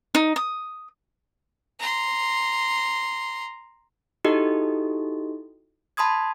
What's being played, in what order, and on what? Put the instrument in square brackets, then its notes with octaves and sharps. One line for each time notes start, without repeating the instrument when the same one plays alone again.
[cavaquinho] D#4
D#6
[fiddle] A#5 C6
[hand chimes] D#4 E4 F#4 G4 A4 D#5
A5 B5 C6 D#6 G#6